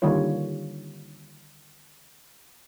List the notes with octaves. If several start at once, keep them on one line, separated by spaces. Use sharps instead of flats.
D3 D#3 G3 A#3 F4 C#5